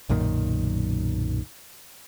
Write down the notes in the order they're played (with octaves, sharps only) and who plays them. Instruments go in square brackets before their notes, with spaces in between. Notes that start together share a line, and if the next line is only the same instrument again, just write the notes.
[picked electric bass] B1 F#2 A#2 D#3